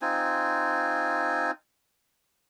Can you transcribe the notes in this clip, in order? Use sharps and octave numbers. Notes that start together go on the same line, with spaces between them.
C4 D#4 F4 G#5